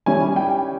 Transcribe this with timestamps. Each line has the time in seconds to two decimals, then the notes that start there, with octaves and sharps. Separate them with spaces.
0.06 D#3 G3 C#4 E4 G#5
0.36 G5